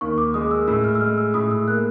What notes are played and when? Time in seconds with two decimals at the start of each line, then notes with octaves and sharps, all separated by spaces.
0.01 D#2 C#6
0.18 D6
0.34 G#3 D#6
0.51 E6
0.68 A2 E6
0.84 F6
0.95 E6
1.01 G#3 F6
1.18 E6
1.34 A2 D#6
1.51 E6
1.68 A#3 F#6